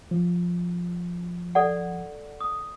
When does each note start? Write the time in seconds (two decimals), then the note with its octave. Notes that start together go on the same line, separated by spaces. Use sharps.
0.11 F3
1.55 A4 D5 F#5
2.40 D#6